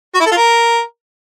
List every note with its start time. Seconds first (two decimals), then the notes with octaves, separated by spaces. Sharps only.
0.15 F#4
0.20 E4
0.26 A4
0.31 F4
0.37 A#4